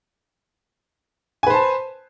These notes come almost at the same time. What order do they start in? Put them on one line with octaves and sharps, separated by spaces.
G#5 B4 C5 A5